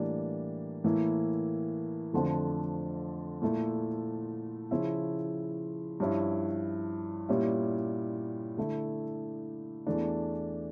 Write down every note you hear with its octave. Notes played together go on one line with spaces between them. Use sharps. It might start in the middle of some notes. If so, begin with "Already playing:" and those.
Already playing: A2 E3 G3 A#3 D4
A2 E3 A#3 E4
F2 D3 F3 A3
A#2 A3 E4
C#3 F3 C#4 E4
G2 F3 C#4 E4
A#2 G3 C#4 E4
D3 A3 E4
E2 E3 A3 D4